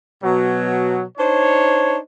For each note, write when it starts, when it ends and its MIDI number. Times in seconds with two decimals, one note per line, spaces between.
0.23 1.02 47
0.23 1.02 54
1.18 1.97 62
1.18 1.97 63
1.18 1.97 72
1.18 1.97 73